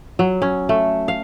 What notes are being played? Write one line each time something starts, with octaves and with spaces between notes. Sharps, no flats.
F#3
C#4
A3
F5